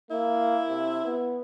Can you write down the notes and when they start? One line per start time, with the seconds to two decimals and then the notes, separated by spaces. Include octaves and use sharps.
0.11 A#3 E4
0.69 C3
1.05 B3